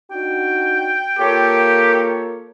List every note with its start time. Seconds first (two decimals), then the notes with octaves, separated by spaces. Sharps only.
0.11 D4 D#4 F#4 G5
1.19 A#3 F4 G4 A4 A#4 C#5